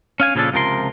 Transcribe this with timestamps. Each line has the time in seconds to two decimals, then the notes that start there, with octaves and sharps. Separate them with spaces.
0.20 C#4 F5 G#5
0.35 A#2 C#3 F3 C#4 D4 A4
0.53 C#2 C3 F3 A#4 C6